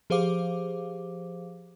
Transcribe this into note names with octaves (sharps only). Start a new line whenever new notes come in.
F3 G4 G#4 C5 F5 D6